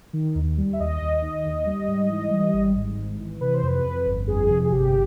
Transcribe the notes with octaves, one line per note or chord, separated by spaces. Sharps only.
D#3
D#2
G3
E5
D#2 D#5
D#2
D#3
D#2
G3
G#2
E3
G3
G#1
G#2
G#1
E3
C3 B4
C5
F2 B4
F2
G1
F2 G#4
C3
G#4
G1 G4